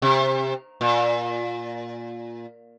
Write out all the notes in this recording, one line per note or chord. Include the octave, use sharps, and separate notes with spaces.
C3
A#2